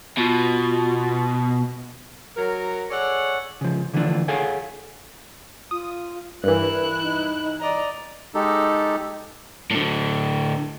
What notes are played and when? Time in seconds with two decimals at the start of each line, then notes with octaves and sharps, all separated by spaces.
0.18 B2 F4
2.37 F#3 A#4
2.91 G#4 A4 C#5 D5 F#5
3.61 C#3 F3
3.93 D3 E3 F3 A3 D4 F4
4.28 G#4 A4 C#5 F5 F#5 G#5
5.71 F4 D#6
6.44 G2 E3 E4 A#4 F#6
7.02 D#4
7.60 D5 D#5 A#5
8.35 G#3 D#4 G4 A4
9.71 A2 D3